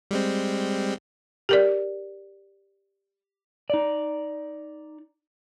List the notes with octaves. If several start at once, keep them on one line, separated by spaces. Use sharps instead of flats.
G3 G#3 C4
G4 A#4 D5
D#4 D5